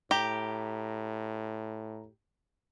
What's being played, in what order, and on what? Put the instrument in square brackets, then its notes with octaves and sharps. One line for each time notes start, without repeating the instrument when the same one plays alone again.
[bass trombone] A2 [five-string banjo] G4 [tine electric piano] A#5